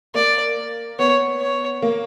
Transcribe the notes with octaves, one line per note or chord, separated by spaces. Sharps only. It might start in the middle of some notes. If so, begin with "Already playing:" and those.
A#3 D5
B3 C#5
C#5
A#3